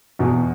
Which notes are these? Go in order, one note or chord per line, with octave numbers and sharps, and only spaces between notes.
E2 B2